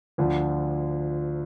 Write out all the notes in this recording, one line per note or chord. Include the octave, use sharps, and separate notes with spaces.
D2 D3 F3